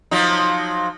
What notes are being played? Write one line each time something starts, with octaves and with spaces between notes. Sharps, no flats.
F3 F#3 D#4